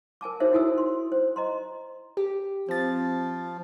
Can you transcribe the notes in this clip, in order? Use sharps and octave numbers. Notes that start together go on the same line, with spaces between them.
A#4 G#5 A5 D6
D#4 F#4 G#4 C5 C#5 E5
E4 F#4 A4 G#5 D#6 E6
C6
C5
D#5 A#5 C6
G4
F3 C4 A6